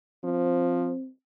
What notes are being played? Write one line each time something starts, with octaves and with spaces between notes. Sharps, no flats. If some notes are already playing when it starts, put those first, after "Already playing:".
F3 C4